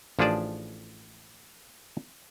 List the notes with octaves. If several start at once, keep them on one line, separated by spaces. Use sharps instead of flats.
A1 F3 D4 G#4 D5 A5